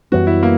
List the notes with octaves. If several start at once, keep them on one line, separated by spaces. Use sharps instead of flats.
F#2 E3 G3 B3 F#4
E4
A#3